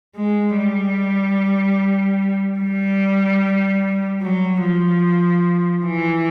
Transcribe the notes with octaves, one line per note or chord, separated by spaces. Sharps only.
G#3
G3
G3
F#3
F3
E3